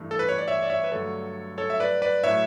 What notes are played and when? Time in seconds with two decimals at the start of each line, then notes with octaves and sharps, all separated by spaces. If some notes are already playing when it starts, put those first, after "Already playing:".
Already playing: G2 E3 A3
0.11 A4
0.19 B4
0.29 C#5
0.38 D5
0.48 C#5 E5
0.63 D5
0.70 C#5 E5
0.84 B4
0.92 G2 D3 F#3 A3 A4 C#5
1.58 A4 C#5
1.70 E5
1.80 B4 D5
2.02 B4 D5
2.24 A2 F#3 A3 C#5 E5